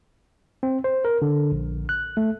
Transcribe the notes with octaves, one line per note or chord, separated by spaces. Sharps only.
C4
C5
A#4
D3
A#1
F#6
A3